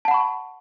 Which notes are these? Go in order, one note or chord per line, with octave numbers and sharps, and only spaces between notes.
F#5 A5 B5 C#6